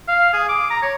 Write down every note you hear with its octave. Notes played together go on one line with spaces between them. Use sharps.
F5
G#4
D6
A#5
C#5